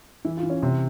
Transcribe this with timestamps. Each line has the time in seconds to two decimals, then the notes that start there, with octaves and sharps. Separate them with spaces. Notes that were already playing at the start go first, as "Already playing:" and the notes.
0.25 E3 E4
0.37 F4
0.43 E3
0.50 C#4
0.62 C3 C4